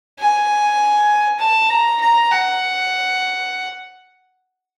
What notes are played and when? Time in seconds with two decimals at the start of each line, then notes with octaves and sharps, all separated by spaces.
0.20 G#5
1.40 A5
1.70 A#5
2.01 A#5
2.31 F#5